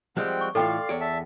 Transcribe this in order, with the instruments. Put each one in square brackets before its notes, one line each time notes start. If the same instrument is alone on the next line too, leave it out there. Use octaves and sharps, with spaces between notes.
[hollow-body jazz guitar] F3 G3 G#3 [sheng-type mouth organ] C4 F#5 G5
[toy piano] C#6
[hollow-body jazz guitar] A2 E3 F4 [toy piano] A4 G5 [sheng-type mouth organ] D5 F5 C6
[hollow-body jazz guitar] E2 C#5 D5
[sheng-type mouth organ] E5 A5